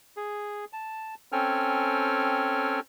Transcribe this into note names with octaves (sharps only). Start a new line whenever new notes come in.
G#4
A5
C4 C#4 A4 G5 G#5 F6